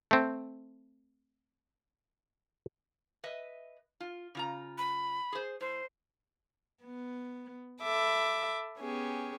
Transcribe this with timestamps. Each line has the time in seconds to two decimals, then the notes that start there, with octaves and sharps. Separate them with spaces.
0.11 A3 C4
3.24 B4 D#5 E5
4.00 F4
4.35 C#3 F4 A#5
4.78 B5
5.32 G#4 C5
5.61 A2 C5
6.84 B3
7.82 A4 E5 B5 D6
8.79 B3 C#4 G4 G#4